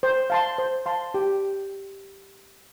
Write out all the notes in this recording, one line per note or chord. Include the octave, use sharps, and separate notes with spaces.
C5
F5 A5 C6
C5
F5 A5 C6
G4